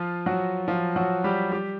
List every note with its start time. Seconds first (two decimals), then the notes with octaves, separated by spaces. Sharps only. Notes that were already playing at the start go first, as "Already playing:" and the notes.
Already playing: F3 F4
0.26 F#3 F#4
0.68 F3 F4
0.96 F#3 F#4
1.24 G3 G4
1.52 G3 G4